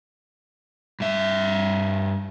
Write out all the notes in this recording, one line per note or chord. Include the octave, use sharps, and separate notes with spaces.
G2 E5